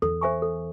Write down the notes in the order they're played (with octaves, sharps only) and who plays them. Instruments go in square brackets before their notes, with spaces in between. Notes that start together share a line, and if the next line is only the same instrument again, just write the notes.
[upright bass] E2 [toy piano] A4
[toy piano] C5 E5 G#5 C#6
A4